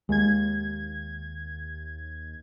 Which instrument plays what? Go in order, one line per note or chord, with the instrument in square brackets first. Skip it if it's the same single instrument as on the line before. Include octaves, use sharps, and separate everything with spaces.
[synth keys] D#2 G#6 [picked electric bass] G#3